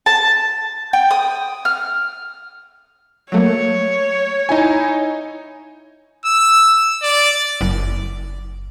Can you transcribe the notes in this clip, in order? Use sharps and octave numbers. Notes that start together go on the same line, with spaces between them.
A5
G5
D#6
F6
F#3 A3 A#3 C#5
D#4 E4 G#5
E6
D5
F#1